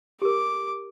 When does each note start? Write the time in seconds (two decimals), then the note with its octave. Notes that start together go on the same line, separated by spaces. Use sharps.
0.22 G4 A#4 D6